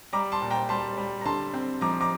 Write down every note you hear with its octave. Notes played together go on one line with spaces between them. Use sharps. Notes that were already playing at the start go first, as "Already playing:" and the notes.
G3 A#5 D6
A5 C6
A#2
G5 A#5
G3 A5 C6
G3
A#5
D3 A5 C6
C4
F3 A#5 D6
A#5 D6